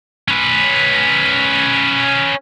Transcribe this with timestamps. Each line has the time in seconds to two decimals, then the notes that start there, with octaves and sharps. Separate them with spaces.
0.28 C#4 B4